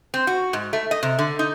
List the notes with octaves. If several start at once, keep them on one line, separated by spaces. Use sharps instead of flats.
C4
F#4
G#2
A3
D#5
C3
D3
D#4